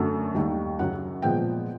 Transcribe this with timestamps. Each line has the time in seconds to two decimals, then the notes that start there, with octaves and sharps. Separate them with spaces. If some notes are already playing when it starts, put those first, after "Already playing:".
Already playing: F#2 D3 F#3 A3
0.35 D#2 D#3 G3
0.79 F#2 C#3 F#3 F#5
1.22 A#2 F3 G#3 B3 G5